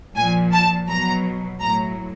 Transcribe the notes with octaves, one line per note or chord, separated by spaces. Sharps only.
A#2 F3 G#5
A5
B2 F#3 A#5
A2 F#3 A#5